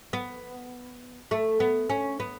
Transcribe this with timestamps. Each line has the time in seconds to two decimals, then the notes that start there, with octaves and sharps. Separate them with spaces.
0.13 B3
1.31 A3
1.60 B3
1.90 C#4
2.20 B3